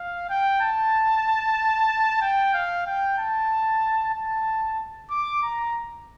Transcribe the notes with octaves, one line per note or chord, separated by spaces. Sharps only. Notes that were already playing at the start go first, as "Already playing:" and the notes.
Already playing: F5
G5
A5
G5
F5
G5
A5
A5
D6
A#5